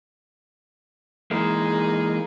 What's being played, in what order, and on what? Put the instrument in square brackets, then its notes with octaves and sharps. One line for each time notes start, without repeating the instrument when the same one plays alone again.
[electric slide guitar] E3 G#3 A#3 [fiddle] D#4 G#4